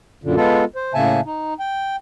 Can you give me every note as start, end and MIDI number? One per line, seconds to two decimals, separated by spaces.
0.24 0.36 42
0.24 0.36 46
0.24 0.36 50
0.36 0.65 56
0.36 0.65 59
0.36 0.65 65
0.36 0.65 69
0.76 0.93 72
0.94 1.21 45
0.94 1.21 49
0.94 1.21 58
0.94 1.21 76
0.94 1.21 80
0.94 1.21 81
1.26 1.54 63
1.60 1.96 79